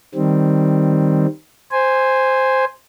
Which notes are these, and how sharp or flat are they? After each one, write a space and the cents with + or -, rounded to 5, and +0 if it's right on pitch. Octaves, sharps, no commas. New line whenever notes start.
D#3 +0 G3 +0 C4 +0
C5 +0 G#5 -10